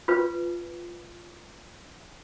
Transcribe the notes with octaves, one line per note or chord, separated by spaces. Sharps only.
F4 B4